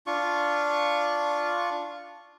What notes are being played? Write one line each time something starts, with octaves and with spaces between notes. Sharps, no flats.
D4 F4 C#6